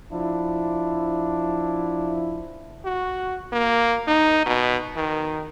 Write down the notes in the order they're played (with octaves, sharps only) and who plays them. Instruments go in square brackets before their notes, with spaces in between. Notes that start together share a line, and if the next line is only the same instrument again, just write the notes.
[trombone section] F3 D4 E4
[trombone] F#4
A#3
D#4
B2
D#3